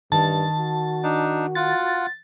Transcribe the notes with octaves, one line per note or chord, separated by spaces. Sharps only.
G2 D#3 A5
F#4
D4 D#4
F4 F#5 A6